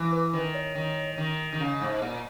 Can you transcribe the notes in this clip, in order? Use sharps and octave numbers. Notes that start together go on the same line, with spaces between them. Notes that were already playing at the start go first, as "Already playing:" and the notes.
Already playing: E3
B4
D#3 B4
C#5
D#3
D#3
D#3
C#3
G#2
A#2